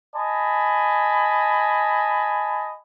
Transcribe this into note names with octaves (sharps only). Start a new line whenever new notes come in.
D#5 G#5 A5 B5